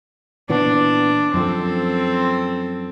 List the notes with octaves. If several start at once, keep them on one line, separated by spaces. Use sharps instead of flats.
A#2 E3 B3 D4
F#2 F3 C4 A4